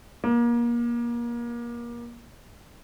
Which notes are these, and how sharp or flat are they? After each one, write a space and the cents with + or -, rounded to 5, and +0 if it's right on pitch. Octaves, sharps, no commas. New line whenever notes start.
A#3 +30